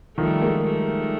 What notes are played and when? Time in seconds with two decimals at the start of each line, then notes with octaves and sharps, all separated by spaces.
0.18 D#3 F3 G3 A3
0.42 G#3 A#3
0.65 G3 A3